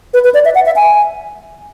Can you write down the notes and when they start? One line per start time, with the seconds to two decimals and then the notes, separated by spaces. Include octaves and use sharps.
0.14 B4
0.24 B4
0.34 D5
0.45 E5
0.55 F#5
0.66 E5
0.76 G#5